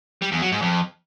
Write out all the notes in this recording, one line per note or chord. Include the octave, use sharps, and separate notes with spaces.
G3
E2
F#3
G#2
F2